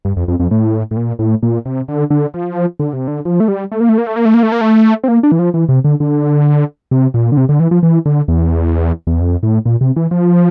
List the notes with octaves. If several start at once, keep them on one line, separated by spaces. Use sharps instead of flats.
G2
F2
F2
F2
A2
A2
A#2
A2
A#2
C3
D3
D3
F3
D3
C3
D3
F3
A3
G3
A3
A#3
A3
A#3
A3
A#3
A3
A#3
A3
A#3
A3
C4
A#3
D4
E3
F3
E3
C3
D3
D3
C3
A#2
D3
C3
D3
E3
F3
E3
D3
E2
E2
F2
A2
A#2
C3
E3
F3